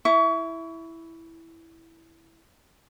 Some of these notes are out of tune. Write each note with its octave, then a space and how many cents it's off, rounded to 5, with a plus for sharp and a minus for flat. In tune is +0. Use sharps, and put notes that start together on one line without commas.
E4 +0 C#6 +30